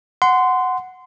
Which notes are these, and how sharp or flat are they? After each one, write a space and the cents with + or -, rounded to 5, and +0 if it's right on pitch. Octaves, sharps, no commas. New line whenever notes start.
F#5 +0 C6 -20